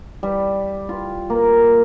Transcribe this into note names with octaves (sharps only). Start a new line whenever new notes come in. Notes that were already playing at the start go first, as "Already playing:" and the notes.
G3
F4
A#3